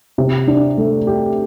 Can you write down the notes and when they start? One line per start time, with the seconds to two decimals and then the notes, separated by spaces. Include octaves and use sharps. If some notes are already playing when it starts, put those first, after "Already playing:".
0.18 C3
0.47 D4
0.77 A3
1.07 G4